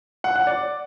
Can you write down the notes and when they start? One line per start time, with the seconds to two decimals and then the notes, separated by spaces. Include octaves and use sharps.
0.24 F#5
0.36 F#5
0.47 D5